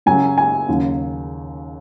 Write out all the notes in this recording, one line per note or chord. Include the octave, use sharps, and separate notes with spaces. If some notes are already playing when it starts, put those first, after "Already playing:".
F#2 C#3 F#3 G#5
G#5
D#2 C#3 F#3